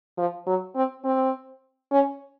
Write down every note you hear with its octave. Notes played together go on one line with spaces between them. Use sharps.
F3
F#3
C4
C4
C#4